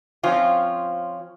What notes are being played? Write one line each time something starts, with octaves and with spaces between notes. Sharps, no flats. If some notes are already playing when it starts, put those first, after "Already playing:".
F3 C4 C#4 F4